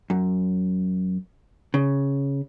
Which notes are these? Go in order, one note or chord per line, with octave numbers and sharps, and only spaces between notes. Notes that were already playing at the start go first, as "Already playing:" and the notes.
F#2
C#3